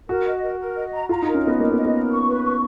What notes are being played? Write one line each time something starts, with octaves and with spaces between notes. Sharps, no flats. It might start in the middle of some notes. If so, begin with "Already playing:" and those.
F#4 A#4
D#5
A#4
A#4
D#5
A#5
F4 A#5
D#4 A#4
C#4
B3 D#5
A#3 A#4
B3
D#5
B3
A#4
C#6
B4
C#6